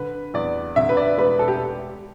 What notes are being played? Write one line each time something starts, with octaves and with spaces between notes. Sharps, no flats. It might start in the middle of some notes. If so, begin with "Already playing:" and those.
Already playing: D3 B4
E2 D5
D3 E5
B4
D5
E1 B4
A4
G4